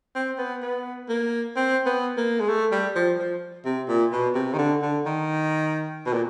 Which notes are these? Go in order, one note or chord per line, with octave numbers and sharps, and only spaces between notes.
C4
B3
B3
A#3
C4
B3
A#3
G#3
A3
G3
F3
F3
C3
A#2
B2
C3
D#3
D3
D3
D#3
B2
A#2